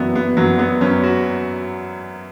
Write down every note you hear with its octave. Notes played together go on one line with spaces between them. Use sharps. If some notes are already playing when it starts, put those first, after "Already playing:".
Already playing: F#2 E3 B3 E4 F#4
B3
F#2 F#3
B3
F#2 C#4
F#4